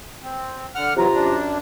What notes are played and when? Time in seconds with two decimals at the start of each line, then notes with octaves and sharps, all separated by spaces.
0.23 C4
0.75 D3 F#5 F6
0.97 C3 E3 F#3 F4 A#5
1.14 F#2 D4